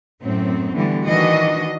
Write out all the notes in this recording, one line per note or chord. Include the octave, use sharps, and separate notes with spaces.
F#2 A2 C4
D3 E3 G3 A3 B3
D#3 E3 D4 F#4 D#5